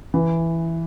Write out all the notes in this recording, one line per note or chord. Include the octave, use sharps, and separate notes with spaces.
E3